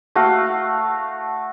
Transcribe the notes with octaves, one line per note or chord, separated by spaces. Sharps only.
A3 F#4 F5